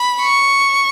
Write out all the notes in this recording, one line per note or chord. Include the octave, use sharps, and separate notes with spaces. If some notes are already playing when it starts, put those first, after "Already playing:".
Already playing: B5
C#6